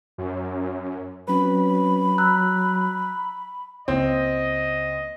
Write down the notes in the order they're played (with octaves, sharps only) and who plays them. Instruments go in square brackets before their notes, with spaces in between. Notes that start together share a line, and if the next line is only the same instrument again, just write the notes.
[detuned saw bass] F#2
[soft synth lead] F#3 [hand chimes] C4 C#4 B4 [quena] B5
[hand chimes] A#5 E6 F#6
[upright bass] C#2 A#3 [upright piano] C4 [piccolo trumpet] D#5